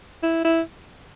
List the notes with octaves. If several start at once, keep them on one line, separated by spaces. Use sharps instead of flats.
E4
E4